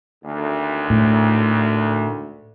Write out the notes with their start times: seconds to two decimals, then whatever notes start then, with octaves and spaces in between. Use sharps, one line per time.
0.25 G#1 D2
0.90 A2